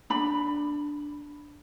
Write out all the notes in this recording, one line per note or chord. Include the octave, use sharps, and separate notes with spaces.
D4 B5